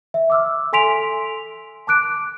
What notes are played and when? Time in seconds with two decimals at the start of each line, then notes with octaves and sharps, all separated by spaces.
0.14 E5
0.30 D6 E6 F6
0.73 A4 G#5 C6 B6 D7 F7
1.87 A5 D6 F#6 D7